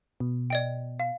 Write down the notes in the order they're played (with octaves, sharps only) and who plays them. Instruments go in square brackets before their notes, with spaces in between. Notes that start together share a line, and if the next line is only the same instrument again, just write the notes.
[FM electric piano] B2
[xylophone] D5 D#5 G5
F5